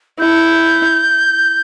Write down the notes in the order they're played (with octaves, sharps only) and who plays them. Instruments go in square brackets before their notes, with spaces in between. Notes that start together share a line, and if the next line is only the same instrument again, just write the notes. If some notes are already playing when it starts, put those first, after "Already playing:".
[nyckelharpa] E4 [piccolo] G6